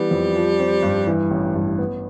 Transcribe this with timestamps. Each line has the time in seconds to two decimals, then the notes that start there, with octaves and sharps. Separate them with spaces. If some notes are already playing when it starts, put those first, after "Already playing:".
Already playing: E3 G3 B3
0.11 F2
0.35 F3
0.59 C4
0.82 G2
1.07 E3
1.31 A1
1.55 G2
1.78 B3